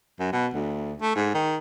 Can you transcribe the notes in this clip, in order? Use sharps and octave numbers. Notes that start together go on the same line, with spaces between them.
F#2
B2
D2
A3
G#2
D#3